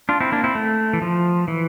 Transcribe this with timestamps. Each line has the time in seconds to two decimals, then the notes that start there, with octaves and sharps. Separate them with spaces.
0.09 D4 F4
0.21 C4 E4
0.32 A#3 D4
0.44 C4 E4
0.55 A3
0.93 E3
1.02 F3
1.48 E3